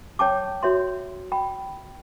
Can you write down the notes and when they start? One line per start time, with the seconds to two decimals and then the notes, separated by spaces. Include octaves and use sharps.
0.19 C#5 G5 A5 D6
0.63 F#4 C#5 E5 C6
1.32 G5 B5